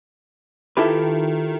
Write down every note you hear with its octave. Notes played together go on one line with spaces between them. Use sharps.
D#3 E4 F4 G4 A4 B4 E5